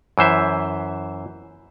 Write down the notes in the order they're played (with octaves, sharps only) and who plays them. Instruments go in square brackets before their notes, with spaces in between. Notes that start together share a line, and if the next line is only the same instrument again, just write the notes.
[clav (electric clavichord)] F#2 E3 C5 E5